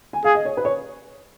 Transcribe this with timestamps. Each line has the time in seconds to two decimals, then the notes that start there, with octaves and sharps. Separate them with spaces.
0.13 G#5
0.24 G#4 F5
0.35 D#5
0.45 C#5
0.57 B4
0.65 C#5